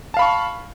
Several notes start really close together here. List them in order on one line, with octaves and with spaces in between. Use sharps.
A5 F5 B5 C#6